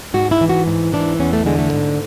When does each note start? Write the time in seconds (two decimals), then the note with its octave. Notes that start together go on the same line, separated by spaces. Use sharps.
0.14 G#2 F#4
0.31 E4
0.41 E3
0.49 F#4
0.67 G#2
0.93 E3 D4
1.20 E2 C#4
1.33 A3
1.46 D3 G#3
1.59 A3
1.73 G#2